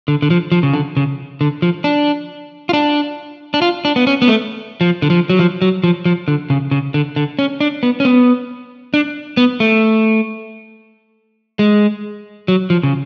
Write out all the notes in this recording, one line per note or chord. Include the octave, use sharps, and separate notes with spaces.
D3
D3
F3
F3
C#3
D3
C#3
D3
F3
D4
F4
D4
D4
F4
D4
B3
C#4
B3
A3
F3
D3
F3
F#3
F3
F#3
F3
F3
D3
C#3
C#3
D3
D3
C#4
D4
B3
C#4
B3
D4
B3
A3
G#3
F#3
F3
C#3